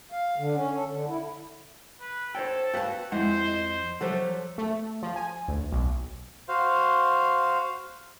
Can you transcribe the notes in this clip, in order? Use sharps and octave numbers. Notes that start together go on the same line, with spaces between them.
F5
D3
C#4
A4
D3
E4
B4
A4 C5 C#5 G5
F#4 B4 F5 G5 A5
F2 G#3 E4 C5 F#5
D#5
F3 F#3 A3 G4 A4 F#5
A3
F3
G#5
D2
B1
F#4 C5 F5